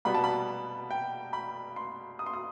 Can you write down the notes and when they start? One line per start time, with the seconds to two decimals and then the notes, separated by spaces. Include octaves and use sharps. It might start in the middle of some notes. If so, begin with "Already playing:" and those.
0.05 B2 G3 B3 B5
0.14 A5
0.24 B5
0.91 G5
1.33 B5
1.76 C6
2.19 D#6
2.26 C6
2.34 D#6